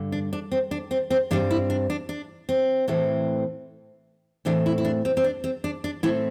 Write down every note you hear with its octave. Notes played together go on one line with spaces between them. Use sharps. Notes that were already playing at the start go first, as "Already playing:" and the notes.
Already playing: G2 D3
D4
D4
C4
D4
C4
C4
G2 G3 C4 D4
E4
D4
D4
D4
C4
A2 E3 A3 C4
A2 E3 A3 C4 D4
E4
E4
D4
C4
C4
D4
C4
D4
D4
A2 A3 C4 E4